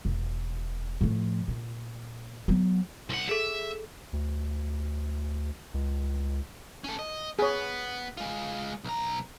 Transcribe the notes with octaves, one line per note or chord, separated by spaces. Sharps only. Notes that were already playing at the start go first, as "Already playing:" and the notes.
E1
A2 F3
A#2
F#3 B3
C2 F#5
G#4 A4 E5
D2
C#2
C#4 A4
D#5
B3 G#4 C#5
G#3 F4
B1 A#5